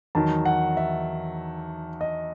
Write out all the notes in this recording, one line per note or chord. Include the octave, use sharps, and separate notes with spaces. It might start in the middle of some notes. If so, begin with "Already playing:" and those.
E2 D#3 F#3 A5
F#5
E5
D#5